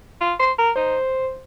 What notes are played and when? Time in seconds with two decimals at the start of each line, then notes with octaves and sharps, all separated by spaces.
0.21 F4
0.39 C5
0.58 A#4
0.76 D#4 C5